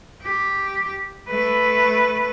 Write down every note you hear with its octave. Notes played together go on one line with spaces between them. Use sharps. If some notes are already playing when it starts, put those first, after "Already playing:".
G4
A3 B4